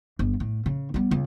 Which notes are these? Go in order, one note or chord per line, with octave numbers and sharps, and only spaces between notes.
G1
A2
C#3
G3 B3
C#2